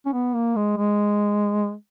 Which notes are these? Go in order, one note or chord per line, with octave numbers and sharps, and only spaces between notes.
C#4
B3
A#3
G#3
G#3